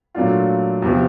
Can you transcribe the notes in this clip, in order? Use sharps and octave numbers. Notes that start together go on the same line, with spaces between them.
A#2 F#3 A3 D4 F4
E2 C3 F3